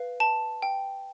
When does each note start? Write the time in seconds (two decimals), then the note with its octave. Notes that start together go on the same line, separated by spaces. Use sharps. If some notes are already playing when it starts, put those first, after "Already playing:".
Already playing: B4 F5
0.20 A5
0.62 G5